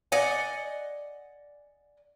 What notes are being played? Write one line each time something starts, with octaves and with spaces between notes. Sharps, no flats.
D5 D#5 F#5 G#5